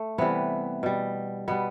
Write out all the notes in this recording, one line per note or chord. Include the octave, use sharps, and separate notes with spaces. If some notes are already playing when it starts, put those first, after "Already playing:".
Already playing: A3
C3 E3 G3 B3
B2 G3
B2 G3 B3